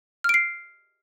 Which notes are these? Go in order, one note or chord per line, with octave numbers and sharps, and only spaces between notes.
F6 C7 D7